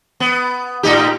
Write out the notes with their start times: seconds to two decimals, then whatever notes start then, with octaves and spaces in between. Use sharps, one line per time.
0.20 B3
0.83 A2 D#4 G4